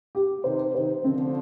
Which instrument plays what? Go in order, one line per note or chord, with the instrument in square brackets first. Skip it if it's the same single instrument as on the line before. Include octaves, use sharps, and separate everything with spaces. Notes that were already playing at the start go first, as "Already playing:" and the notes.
[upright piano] G4
[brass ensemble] C3 D#3 [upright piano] C5
[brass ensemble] C3 D#3 [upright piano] C5
[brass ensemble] D3 F3 [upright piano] C4